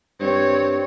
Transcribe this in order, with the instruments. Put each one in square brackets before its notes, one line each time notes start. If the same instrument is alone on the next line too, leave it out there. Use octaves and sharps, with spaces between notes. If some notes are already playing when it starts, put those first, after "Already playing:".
[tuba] G2 [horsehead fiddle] C4 C#5